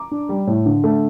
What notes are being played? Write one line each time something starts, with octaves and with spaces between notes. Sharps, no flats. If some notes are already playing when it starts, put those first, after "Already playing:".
Already playing: A#5 D6
D4
G3
A2
D3
A3